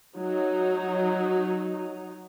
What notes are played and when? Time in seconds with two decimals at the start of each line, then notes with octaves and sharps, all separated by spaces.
0.16 F#3 D#4